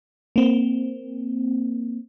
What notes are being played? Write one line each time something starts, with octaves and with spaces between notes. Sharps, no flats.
A#3 C4